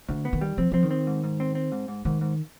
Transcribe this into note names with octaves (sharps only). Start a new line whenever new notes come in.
D2 D3
B3
D#3
G3
F3 C4
F3 C4
D#3
C4
G#2
G#2
C4
C4
G#2
G#2
G#2 D#3
G#2